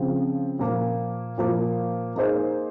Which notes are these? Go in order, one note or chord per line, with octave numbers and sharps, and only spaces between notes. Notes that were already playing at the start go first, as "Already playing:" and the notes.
Already playing: C#3 F3 C4
A#2 F3 A#3
A#2 F3 A#3
A#3 D#4 G#4 C5